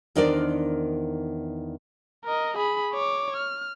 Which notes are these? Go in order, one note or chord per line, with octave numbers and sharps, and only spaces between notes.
E2 D#3 D4 A#4 C5 D5
A#4 D#5
G#4 B5
C#5 D6
F6